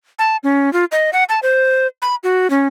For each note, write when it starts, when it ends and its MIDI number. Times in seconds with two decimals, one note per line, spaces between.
0.19 0.37 81
0.44 0.72 61
0.73 0.85 65
0.92 1.10 75
1.13 1.24 78
1.29 1.40 81
1.43 1.87 72
2.02 2.15 83
2.24 2.50 66
2.50 2.68 61